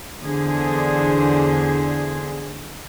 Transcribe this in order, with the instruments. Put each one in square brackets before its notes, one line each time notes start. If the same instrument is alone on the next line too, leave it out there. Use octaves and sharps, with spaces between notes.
[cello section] E2 D3 G#4 C5